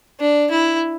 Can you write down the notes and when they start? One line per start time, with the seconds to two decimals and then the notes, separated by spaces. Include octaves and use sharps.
0.20 D4
0.51 E4